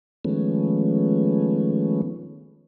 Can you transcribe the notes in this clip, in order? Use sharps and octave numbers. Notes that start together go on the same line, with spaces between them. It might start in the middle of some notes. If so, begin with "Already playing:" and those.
D#3 F3 G#3 A3 B3 C#4